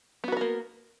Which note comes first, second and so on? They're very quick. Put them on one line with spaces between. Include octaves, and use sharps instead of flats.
B3 F#4 B4 A#4 A#3